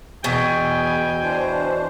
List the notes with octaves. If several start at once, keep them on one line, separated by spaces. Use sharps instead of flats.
E2 B2 G5 G#5
E3 D4 C5